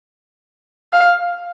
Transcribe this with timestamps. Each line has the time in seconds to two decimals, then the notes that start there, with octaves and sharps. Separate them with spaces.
0.93 F5